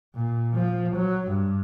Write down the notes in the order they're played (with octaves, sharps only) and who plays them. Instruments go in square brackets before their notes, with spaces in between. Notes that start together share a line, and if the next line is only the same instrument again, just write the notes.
[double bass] A#2
F3
F#3
G2